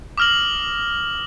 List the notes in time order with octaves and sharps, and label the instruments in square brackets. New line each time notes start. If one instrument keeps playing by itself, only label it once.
[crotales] D6 D#6 F6 A#6 F#7